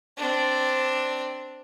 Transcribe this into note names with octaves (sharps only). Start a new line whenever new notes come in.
C4 D4